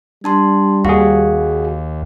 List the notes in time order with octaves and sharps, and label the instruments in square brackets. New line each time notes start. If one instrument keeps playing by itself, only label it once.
[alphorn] G3 [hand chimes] D4 A5 C6
[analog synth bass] D#2 [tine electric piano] F#4 G#4 [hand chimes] F5